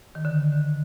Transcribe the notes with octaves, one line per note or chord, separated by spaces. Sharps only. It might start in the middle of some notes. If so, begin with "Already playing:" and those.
D#3
D3